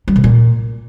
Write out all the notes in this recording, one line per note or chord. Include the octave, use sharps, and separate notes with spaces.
G3
B2
A#2